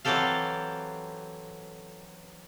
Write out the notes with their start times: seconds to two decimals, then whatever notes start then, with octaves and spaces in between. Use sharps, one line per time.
0.05 E3 F#3 C4 G4 A4 F5